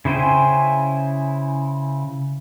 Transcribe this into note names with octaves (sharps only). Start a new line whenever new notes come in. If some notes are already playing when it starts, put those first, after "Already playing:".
C#3 E4 C5 G5 G#5